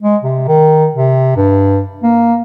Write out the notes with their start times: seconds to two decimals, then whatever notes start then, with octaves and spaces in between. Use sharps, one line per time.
0.03 G#3
0.23 C3
0.48 D#3
0.95 C3
1.36 G2
2.03 A#3